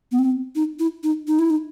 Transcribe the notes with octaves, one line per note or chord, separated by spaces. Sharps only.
B3
C4
D#4
E4
D#4
D#4
E4
D#4